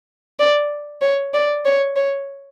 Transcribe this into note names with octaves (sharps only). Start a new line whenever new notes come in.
D5
C#5
D5
C#5
C#5